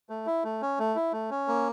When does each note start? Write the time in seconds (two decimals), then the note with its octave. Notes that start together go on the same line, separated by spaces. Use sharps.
0.09 A3
0.26 E4
0.44 A3
0.62 C#4
0.79 A3
0.95 E4
1.13 A3
1.30 C#4
1.48 A#3